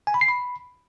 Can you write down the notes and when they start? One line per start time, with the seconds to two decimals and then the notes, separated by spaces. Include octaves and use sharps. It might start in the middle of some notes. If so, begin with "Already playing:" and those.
0.07 G#5
0.14 B5
0.21 C7
0.28 B5